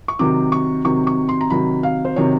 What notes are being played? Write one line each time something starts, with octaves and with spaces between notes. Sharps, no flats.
C#6
C3 D#3 F#3 D6
C#6
C3 D#3 F#3 C#6
C#6
C6
A#5
C3 D#3 F#3 B5
F5
C5
C3 D#3 F#3 C#5